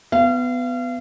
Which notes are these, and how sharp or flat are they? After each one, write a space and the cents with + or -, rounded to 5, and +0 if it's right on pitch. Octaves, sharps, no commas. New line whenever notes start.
B3 +20 F5 -35